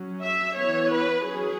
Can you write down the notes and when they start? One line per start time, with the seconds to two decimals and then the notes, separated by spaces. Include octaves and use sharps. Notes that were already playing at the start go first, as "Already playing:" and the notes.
Already playing: F#3 C#4
0.23 E5
0.57 E3 B3 C#5
0.91 B4
1.25 F#3 C#4 G#4